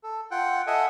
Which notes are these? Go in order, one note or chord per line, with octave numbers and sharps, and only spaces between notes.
A4
F4 F#5 G5
A4 D#5 E5 F#5 G#5